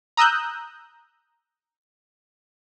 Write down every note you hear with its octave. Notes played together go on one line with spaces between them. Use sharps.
A#5 D#6 E6 F#6 G6